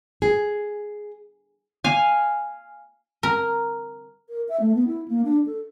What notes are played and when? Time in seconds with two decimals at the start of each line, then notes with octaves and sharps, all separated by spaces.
0.22 G#4
1.84 F5 G#5
3.23 A#4
4.29 A#4
4.49 E5
4.60 A3
4.75 B3
4.87 E4
5.08 A#3
5.24 D4
5.46 A4